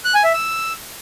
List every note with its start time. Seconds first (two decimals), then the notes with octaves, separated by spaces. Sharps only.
0.05 F#6
0.14 G#5
0.24 E5
0.34 E6